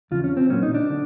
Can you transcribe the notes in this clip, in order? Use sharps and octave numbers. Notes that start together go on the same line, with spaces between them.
E2 C#3 F3 F4
C#4
C4
A#2 F#3 A#3 C#4
D#4
D4
D3